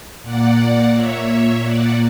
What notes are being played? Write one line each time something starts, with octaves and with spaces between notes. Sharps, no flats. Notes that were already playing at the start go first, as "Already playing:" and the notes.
A#2 A#3 D5 F#5
C#5 E5
D5 F#5